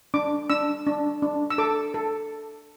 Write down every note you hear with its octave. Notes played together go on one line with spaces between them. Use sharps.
D4 D6
D4 E6
D4
D4
E6
A4 D6
A4